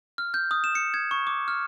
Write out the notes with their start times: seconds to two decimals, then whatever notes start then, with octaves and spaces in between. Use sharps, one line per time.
0.18 F6
0.34 G6
0.51 D#6
0.64 E7
0.75 C#7
0.94 G#6
1.11 C#6
1.27 D6
1.48 F6